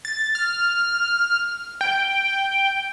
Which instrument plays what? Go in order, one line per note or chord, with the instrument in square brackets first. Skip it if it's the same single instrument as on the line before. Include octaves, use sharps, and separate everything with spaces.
[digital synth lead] A6
F6
G5